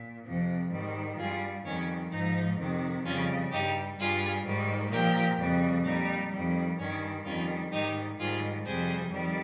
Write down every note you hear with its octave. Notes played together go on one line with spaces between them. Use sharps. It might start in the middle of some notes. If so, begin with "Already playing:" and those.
Already playing: A#2
F2 C3 F3
G#2 D#3 G3
G2 G3 F4 G#4
F2 D#3 G3 C#4
G#2 F3 D#4
F2 C3 D#3
F2 C#3 G3 C#4 F4
G2 G3 D#4 G4
G2 G3 F4 G#4
G#2 D#3 G3
A#2 F3 G4 A#4
F2 C#3 G3
A#2 G3 D#4
F2 D#3 G3
G2 D#3 G3 C#4
F2 D#3 G3 C#4 F4
G#2 D#3 G3 D#4 G4
G#2 D#3 G3 F4 G#4
F2 C3 G3 G#4 C5
F2 D#3 G3